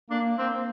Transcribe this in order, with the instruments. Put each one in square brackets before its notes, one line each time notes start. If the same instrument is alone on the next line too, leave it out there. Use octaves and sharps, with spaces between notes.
[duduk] A#3 [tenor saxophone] D4
[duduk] A#3 [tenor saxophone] C4